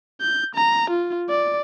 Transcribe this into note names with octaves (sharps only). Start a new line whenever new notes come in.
G6
A#5
F4
D5